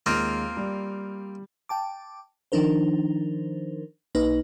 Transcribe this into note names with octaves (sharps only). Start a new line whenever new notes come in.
D#2 G#3 A#3 C4 F4 D7
G3
G5 A5 D6
D#3 F3 D4 D#4 A#4 C5
B1 A#3 D#4 B4 D#5